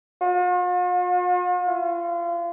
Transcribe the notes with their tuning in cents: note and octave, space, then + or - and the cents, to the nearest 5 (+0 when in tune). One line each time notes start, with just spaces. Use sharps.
F4 +45
F4 -30